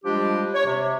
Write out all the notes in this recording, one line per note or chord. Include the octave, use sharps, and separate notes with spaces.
F3 G3 G#3 D4 G4
C#5
C3